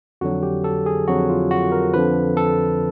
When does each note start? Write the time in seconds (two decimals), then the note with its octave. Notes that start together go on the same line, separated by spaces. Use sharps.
0.21 F2 D3 F#3 F#4
0.43 G4
0.64 A4
0.86 G#4
1.08 F2 D3 F#3 F#4
1.29 F4
1.51 F#4
1.72 A#4
1.94 F2 D3 F3 B4
2.37 A4